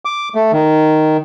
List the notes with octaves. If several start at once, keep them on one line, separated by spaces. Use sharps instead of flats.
D6
A3
D#3